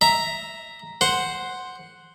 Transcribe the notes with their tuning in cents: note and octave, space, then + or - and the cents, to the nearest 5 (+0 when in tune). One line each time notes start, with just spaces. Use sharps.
E5 +0 A#5 +0
C5 +0 F#5 +0